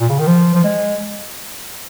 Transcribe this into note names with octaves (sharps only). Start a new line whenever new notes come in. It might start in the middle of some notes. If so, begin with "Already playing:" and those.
A#2
C#3
D#3
F3
F3
G#3